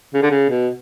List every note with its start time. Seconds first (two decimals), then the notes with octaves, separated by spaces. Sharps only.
0.14 C#3
0.22 D3
0.31 C#3
0.50 B2